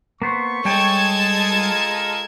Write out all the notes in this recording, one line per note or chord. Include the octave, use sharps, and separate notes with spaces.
A#3 B3 C5 C#6
G3 G#3 A4 C#5 G5 A5 G#6
F4 A#4